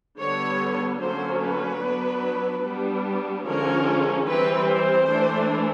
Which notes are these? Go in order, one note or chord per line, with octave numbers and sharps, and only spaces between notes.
D3 G3 B3 C#5
D3 F#3 A#3 C#4 C5
B4
F#3 B3 D4
G3 B3 D4
D3 F3 G#3 C#4 A#4
E3 G3 C4 B4
C5
E3 A3 D4